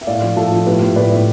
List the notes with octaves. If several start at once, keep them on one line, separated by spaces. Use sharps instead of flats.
E5
A2 D5 F5
F3
A2 F4 A4
F3
A2 G4 B4
A2
A2 B4 D5
A2